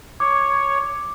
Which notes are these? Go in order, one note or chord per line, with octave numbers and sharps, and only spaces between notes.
C#5 D6